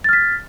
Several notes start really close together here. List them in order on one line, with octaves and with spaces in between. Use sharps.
A6 F6 B6